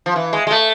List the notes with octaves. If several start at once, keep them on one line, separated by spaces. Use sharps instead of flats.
F3
E3
G#3
G#3
A3